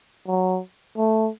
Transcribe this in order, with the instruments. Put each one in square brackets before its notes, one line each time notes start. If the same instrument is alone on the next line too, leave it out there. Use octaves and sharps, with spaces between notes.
[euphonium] F#3
A3